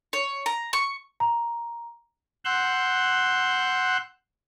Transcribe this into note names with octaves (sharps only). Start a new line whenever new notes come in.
C#5
A#5
C#6
A#5
F#5 C6 E6 F#6 G6